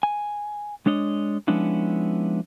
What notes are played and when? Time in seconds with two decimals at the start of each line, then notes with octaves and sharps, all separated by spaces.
0.03 G#5
0.86 G#3 D4 C#5 D#5
1.48 F3 G#3 B3 C#4 D4 E4